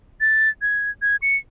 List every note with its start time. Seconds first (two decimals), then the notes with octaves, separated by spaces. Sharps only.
0.21 A6
0.62 G#6
1.02 G#6
1.22 C#7